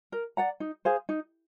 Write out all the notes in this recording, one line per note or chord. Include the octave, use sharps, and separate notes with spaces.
A#4
D5 F#5 A#5
D#4
G#4 C5 F5
D#4